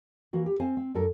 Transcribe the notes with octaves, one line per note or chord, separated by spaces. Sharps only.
E3 A#3 F#4
G4
C4 C5 F5 G#5
C4
F#2 D4 A4 A#4